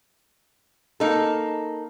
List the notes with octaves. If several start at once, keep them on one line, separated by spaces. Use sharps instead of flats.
A#3 D#4 A4